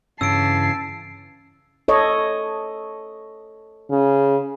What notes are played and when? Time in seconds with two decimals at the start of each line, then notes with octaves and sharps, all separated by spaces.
0.21 G2 C#3 E3 C#4 A5 E6 C7 D7
1.88 A4 C#5 D#5
3.91 C#3